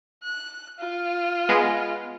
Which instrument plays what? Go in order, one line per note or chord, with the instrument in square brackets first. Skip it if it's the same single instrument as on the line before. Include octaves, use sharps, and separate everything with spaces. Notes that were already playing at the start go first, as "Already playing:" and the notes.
[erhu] F#6
F4
[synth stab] G#3 B3